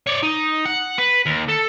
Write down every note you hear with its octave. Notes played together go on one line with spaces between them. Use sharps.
C#5 D5
D#4
F#5
B4
D#2
A4